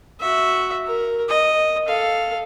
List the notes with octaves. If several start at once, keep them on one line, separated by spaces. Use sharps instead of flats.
F#4 E5
A#4
D#5
A4 F5